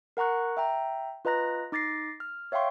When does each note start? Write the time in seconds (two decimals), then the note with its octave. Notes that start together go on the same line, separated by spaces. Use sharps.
0.17 A#4 F#5 A#5 C#6 F#6
0.57 E5 G5 A#5
1.25 F4 B4 D#5 A#5 F#6 A#6
1.72 D#4 D6 A6 A#6 C7
2.20 F6
2.52 C#5 E5 F5 G5 C6 C#6